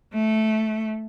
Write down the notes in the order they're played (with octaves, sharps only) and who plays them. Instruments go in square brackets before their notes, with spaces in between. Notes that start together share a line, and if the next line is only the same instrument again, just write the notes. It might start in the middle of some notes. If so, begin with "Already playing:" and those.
[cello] A3